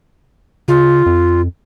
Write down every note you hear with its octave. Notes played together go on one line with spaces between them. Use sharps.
C#3 F4
F2